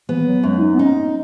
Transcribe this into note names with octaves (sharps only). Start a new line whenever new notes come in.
E3 B3
F#3
F#2 G#3
E4
D#4
B3
C#4 D#4